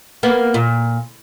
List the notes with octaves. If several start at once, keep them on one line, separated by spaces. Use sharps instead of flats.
A#3 B3
A#2